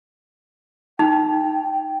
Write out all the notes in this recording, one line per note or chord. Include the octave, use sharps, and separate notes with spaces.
D#4 G5